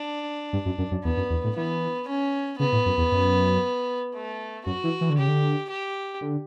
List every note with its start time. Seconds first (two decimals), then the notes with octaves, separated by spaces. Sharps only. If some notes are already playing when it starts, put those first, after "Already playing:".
Already playing: D4
0.53 G2
0.66 F#2
0.78 F#2
0.91 F#2
1.04 E2 B3
1.17 F#2
1.30 E2
1.44 A2
1.56 E3 B3
2.08 C#4
2.59 C#3 B3
2.72 A2
2.86 F#2
2.98 E2
3.12 F#2
4.15 A3
4.66 F#2 F#4
4.84 E3
5.01 E3
5.10 D3
5.18 C#3 G4
5.28 D3
5.70 G4
6.21 D3